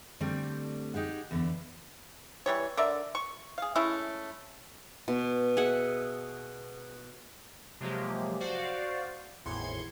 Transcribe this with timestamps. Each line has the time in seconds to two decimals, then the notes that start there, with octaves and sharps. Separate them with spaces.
0.20 D3 G3 A3 C4
0.94 D#4 G4 G#4 F#5
1.31 E2 D3 B3
2.46 E3 G3 C#5
2.77 D3 A#4 D5 E5
3.15 C#6
3.58 G#4 F5
3.75 G#3 A3 C#4 E4
5.08 B2
5.57 G#4 E5 F#5
7.81 C3 F3 F#3 G#3 A#3 G4
8.40 F#4 C5 D5 F5 F#5
9.46 G#1 E2 A2 C6 G#6 C#7